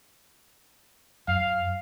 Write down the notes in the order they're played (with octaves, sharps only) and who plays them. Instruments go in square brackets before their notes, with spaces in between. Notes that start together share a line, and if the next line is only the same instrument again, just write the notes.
[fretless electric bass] F#2 [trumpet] F5